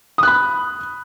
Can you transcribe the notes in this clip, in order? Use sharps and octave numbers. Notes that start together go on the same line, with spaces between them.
B5 D#6 F#6